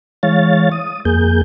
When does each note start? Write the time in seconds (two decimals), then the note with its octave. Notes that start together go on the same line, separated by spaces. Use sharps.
0.23 E3 G#3 C#5 F5 A6
0.72 D#6
1.05 F2 A#3 G#4 G6